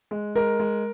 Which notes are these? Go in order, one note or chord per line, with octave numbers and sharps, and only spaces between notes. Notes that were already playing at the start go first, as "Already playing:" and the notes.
G#3
G#3 A#4
G#3